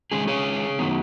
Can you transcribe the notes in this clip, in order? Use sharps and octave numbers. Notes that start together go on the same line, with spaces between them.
D#3 G#3 C#4 G#4
G#4 C#5
D#3 F#3 B3 D#4